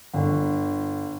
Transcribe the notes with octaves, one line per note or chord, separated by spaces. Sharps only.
G1